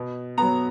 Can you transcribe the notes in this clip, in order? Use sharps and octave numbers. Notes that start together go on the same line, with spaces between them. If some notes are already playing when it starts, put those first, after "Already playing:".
Already playing: B2
F#3 B3 A#5